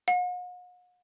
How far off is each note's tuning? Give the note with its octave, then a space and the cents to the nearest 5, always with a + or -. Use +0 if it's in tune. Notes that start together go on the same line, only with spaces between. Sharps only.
F#5 -45